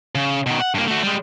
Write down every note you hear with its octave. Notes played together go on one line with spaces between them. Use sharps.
C#3
B2 D#3
F#5
G2 A#3
A3 F#4
G3 G#3